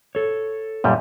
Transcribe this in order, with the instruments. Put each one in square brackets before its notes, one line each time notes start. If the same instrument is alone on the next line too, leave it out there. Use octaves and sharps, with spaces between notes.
[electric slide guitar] A4 C#5
[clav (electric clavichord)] F#2 A#2 G3